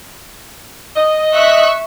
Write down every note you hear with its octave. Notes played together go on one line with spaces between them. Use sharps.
D#5
E5 C#6 F#6